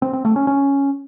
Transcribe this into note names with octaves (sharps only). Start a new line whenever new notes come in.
C4
C4
A3
C#4
C#4